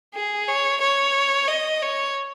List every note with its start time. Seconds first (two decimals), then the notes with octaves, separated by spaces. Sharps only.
0.14 G#4
0.48 C#5
0.81 C#5
1.48 D#5
1.82 C#5